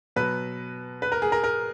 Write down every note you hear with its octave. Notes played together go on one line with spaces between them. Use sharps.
B2 F#3 B4
B4
A#4
G#4
A#4
A#4